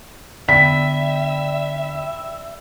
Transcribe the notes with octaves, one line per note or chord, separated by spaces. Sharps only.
D3 B3 D4 D5 E5 G5 B5 B6